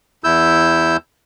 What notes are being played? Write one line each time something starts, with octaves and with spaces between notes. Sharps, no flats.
E2 E4 E6 G6